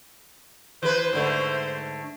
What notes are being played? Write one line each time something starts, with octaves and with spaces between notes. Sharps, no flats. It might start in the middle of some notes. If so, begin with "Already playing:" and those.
E3 B4 C5
G#2 D3 A3